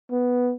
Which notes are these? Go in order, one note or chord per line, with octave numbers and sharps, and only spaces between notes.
B3